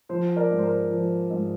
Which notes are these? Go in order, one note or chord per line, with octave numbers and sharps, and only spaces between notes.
F3 C5
A#4 D5
G#2
C5
A#4
F3
G#2